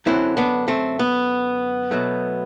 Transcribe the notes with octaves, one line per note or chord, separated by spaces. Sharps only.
F#2 D3 F#3 C4 E4
B3 D4
A3 C4
B3
B2 F#3 A3